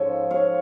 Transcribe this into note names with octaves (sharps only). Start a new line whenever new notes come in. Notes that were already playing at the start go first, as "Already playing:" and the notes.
Already playing: G#2 F3 G#3 C#4 A4 C#5
C#5 F5